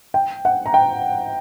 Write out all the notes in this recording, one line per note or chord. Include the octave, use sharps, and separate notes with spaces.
G5
F#5
A#5
G5